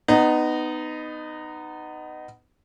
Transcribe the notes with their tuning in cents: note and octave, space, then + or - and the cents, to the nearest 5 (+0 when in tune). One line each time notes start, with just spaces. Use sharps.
B3 +20 D#4 -15